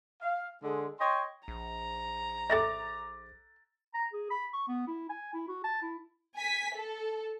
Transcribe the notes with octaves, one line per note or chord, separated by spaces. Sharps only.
F5
D3 G#3 G#4
C#5 D#5 G5 C6
A#1 A#5
A4 D5 E5 D6 A6 A#6
A#5
G#4
B5
C#6
B3
E4
G#5
E4
F#4
A5
E4
G#5 B6
A4